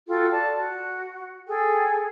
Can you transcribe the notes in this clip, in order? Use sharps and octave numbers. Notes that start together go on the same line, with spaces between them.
F4 F#4 A4 G5
D5 A5
F#4
G#4 A4 G5